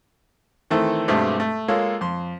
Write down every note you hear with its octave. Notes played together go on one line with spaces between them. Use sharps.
D#3 E3 A3 C4 A4
G2 B2 G#3 A3 C4 G4
A3
G#3 A#3 F4 A4 C#5
F2 C6